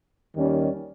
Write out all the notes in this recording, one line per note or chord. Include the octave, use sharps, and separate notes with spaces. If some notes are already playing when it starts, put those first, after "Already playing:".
D#2 D#3 G3 C#4